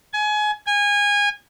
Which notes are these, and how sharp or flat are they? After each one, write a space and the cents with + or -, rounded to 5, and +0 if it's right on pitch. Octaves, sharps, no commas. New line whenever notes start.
G#5 +25
G#5 -25